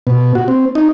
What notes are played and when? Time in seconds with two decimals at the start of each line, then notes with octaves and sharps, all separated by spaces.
0.07 B2
0.35 F#4
0.48 C4
0.75 D#4